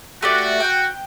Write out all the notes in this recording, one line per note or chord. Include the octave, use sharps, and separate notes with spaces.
A3 F#4 G4 D5
G5 F#6